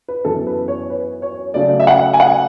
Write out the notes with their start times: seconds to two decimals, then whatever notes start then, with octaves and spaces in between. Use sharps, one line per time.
0.08 B4
0.24 F#2 E3 B3 A4
0.47 B4
0.68 C#5
0.90 B4
1.22 C#5
1.54 C#3 F#3 A3 D5
1.80 E5
1.87 F#5
2.13 G#5
2.20 F#5